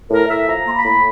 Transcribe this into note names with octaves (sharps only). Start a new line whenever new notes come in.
A2 A#4
A2 E5
F3 A#5
A#3 C6
B5
A2